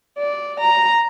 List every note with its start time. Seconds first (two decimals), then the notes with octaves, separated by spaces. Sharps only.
0.18 D5
0.60 A#5